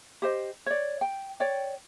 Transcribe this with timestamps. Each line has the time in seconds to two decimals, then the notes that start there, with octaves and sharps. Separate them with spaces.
0.22 G4 C5 D#5
0.66 C#5 D5
1.01 G5
1.40 C#5 D5 G5